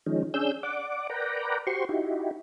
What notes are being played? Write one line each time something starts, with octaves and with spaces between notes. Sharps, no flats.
D#3 F3 G#3 C#4 D#4
C#4 D4 G#4 E6 G6
D5 F#5 D6
A#4 B4 D5 F#5 G5 A#5
F#4 G4 C5 C6 C#6
D#4 E4 F#4 G4